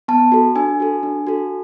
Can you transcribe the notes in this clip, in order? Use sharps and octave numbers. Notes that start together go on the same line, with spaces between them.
B3 A5
F#4 A4
D4 G#5
F#4 A4
D4
F#4 A4